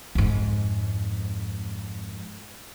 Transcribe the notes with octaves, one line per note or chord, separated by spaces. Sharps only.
F2 G#2